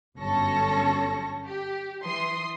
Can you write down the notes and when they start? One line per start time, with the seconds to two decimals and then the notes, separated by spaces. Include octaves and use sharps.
0.18 G1 F#2 C#4 A4 C#6 A#6
1.45 G4
2.01 E3 C6 D#6 C7